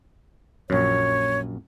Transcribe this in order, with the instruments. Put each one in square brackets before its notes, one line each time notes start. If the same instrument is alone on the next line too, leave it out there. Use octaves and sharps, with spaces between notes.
[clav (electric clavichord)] A#1 F#2 [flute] C#5